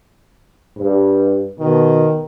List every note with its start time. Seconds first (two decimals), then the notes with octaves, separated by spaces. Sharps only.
0.78 G2
1.60 B2 D#3